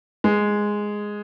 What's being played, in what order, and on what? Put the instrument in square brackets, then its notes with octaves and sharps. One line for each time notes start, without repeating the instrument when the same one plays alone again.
[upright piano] G#3